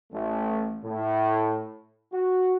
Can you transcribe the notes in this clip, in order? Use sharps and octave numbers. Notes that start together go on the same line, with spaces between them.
A1 A3
A2
F#4